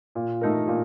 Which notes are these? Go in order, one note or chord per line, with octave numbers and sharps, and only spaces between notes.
A#2
A3 D#4 A#4
A#2